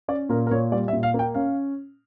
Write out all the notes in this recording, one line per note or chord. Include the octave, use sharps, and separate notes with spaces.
C#4 D5
A#2 A#4
A#4
A#2 C#5
G3 D5
E5
A#2
F5
A#3
G5
C#4 F5